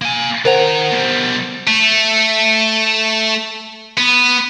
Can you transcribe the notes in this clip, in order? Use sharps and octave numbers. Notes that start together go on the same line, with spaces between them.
A#3 G#5
D#3 A#4 C5 F#5 A#5
B2 G3
A3
B3